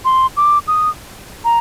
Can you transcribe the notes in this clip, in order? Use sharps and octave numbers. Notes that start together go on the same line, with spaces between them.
C6
D6
D#6
A#5